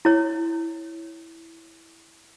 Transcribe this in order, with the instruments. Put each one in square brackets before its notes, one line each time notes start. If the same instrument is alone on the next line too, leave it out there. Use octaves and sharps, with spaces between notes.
[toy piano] E4 C#5